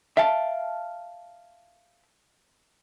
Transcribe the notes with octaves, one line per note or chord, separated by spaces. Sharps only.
E5 F5 G5 A5